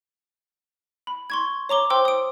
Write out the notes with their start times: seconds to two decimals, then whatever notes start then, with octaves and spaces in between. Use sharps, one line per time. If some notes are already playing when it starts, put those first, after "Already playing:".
1.07 B5
1.30 C6 C#6 G#6
1.69 C#5 A#5 D6 G7
1.90 C5 G5 C6 D6 E6
2.05 D#6 D7